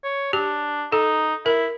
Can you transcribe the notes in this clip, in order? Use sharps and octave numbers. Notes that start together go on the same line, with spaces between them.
C#5
D4 G4
D#4 A4
E4 A#4